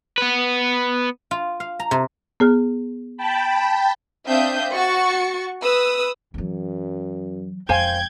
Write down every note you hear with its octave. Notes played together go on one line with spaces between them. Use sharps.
B3 B4
F4
F5
A#5
C3
B3 G#4 F6
G5 A5 B5
C4 D4 E5 F5 D#6 G6
F#4 C#6 A6 C#7
B4 D#6 E6
F#2 E3 F#3
E1 F2 C5 F5 G5 G#5 G6 G#6